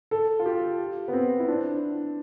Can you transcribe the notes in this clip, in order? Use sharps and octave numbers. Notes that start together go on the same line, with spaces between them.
A4
F4
G4
B3
C4
E4
D4